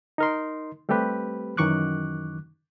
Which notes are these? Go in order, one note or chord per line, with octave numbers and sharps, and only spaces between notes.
D#4 A#4 C6
G3 A3 C4 G4 B4
F#2 D#3 E3 C#6 D6 F#6